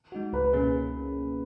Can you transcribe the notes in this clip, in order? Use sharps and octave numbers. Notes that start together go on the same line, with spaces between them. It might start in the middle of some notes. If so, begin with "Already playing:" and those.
G#3 D#4 F#4
C#2 B4
B2 A#3 C#4 G#4